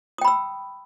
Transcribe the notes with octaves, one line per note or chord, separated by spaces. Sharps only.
G5 B5 D#6 E6